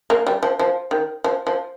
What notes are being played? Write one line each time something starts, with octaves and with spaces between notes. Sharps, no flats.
A#3
G3
F3
F3
D#3
F3
F3